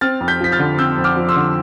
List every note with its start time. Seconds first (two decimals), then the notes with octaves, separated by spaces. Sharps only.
0.01 C4 F6 A6
0.21 F2
0.28 G6 B6
0.41 F3 B6
0.52 F6 A6
0.59 D3
0.78 C4 E6 G6
0.97 F2
1.04 D6 F6
1.17 F3
1.29 C6 E6
1.36 D3